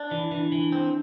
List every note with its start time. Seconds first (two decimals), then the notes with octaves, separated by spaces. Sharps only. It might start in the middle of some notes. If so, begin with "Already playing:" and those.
Already playing: D4
0.11 E3 E4
0.31 E3 D4
0.52 E3
0.72 C4